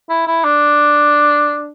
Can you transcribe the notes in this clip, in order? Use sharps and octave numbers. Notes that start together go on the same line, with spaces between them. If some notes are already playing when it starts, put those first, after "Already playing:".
E4
E4
D4